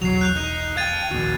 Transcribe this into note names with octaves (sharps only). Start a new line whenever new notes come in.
B1 E2 F#3 C7 F7
F#6 G6 F7
D#4
F5 G5 G#6 A6 D#7
A#1 D#2 A#3 F#4